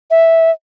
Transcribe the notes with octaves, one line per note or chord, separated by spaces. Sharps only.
E5